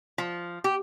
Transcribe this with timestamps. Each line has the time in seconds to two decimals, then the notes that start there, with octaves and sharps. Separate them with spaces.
0.18 F3
0.64 G4